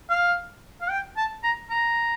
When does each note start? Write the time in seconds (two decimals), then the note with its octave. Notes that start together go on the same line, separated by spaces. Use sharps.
0.09 F5
0.81 F5
0.90 G5
1.17 A5
1.43 A#5
1.70 A#5